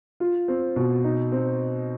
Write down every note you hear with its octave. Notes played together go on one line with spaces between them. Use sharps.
F4
C4
B2
D#4
C4